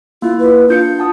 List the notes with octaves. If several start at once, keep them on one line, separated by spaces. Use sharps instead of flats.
A#3 E4 F4
B4
D4 F4 G6 C#7
F#5 A5 D#6